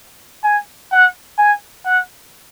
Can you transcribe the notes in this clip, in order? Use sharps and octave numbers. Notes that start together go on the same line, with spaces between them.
G#5
F#5
G#5
F#5